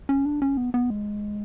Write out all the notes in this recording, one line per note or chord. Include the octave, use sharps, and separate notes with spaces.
C#4
D4
C#4
B3
B3
G#3